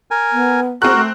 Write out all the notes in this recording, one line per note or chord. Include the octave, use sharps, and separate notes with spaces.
A#4 G#5
B3
C4 F#4 G#4 A#4 F#6
A3